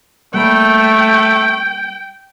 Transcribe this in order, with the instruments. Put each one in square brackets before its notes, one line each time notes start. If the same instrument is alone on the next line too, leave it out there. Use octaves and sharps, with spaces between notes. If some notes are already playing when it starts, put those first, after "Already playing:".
[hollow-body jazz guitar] G3 A#3 B5 [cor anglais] A3 [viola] G5